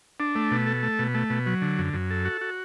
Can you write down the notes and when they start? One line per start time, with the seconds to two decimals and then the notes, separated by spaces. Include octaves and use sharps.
0.20 D4
0.35 A3
0.51 B2
0.67 A4
0.83 A3
0.99 B2
1.14 A3
1.30 B2
1.46 F#3
1.62 D3
1.78 F#2
1.93 F#2
2.11 A4
2.25 F#4
2.41 F#4